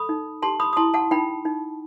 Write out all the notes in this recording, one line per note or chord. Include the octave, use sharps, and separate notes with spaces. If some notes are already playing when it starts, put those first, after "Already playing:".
Already playing: A4 B5 D#6
D#4
G4 A5 C6
B5 D#6
D#6
E4 A5 C6
F#5 A5
D#4 G5 B5
D#4